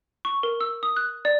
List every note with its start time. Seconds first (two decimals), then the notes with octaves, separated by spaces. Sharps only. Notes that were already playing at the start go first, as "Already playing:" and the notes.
0.25 C#6
0.43 A#4
0.61 E6
0.83 D#6
0.96 F#6
1.25 D5